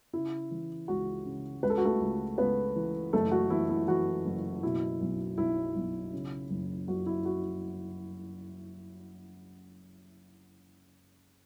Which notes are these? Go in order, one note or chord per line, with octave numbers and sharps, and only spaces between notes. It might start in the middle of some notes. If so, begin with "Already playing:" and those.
C#3 E4
E3
C#2 F#4
C#3
C#2 B4
A4
F#4
A3 A4
C#2
C#2 B3 B4
E3
F#1 A3 A4
F#4
E3 E4
E4
E3 F#4
F#1
B2 E4
B1
B1 E4
B1
C#3
F#1
F#1 F#4
E4
F#4